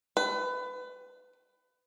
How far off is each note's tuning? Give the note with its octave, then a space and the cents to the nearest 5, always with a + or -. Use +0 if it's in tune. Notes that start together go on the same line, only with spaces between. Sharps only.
B4 +25